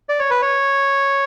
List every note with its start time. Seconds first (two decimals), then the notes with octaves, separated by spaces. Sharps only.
0.09 D5
0.19 C#5
0.30 B4
0.42 C#5